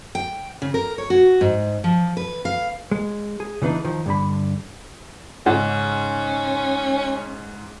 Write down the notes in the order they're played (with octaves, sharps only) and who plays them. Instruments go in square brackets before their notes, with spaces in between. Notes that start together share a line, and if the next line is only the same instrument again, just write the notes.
[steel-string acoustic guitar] G5
C#3
A#4
C#5
F#4
G#2
F3
B4
F5
[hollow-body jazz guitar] G#3
G#4
C#3 E3 B3 D4 D#4
D#3 F3
G2 D3 B5
[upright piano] G#2 C#3 [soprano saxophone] C#4